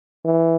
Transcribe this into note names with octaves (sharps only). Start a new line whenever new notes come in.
E3